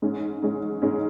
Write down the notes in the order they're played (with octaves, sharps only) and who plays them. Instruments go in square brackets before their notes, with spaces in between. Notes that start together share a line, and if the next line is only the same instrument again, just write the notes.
[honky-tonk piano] G#2 G#3 C#4
G#2 G#3 C#4
G#2 G#3 C#4